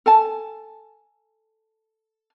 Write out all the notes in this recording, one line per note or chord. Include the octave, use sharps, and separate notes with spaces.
A4 G#5 A5